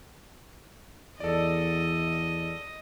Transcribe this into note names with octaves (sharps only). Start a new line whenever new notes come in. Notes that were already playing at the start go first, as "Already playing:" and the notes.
E2 A4 D5 D#5